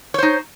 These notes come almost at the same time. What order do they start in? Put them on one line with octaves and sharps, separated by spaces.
C#5 C5 D#4